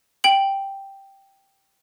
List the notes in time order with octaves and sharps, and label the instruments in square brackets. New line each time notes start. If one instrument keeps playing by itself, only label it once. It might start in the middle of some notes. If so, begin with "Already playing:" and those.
[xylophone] G5 F#7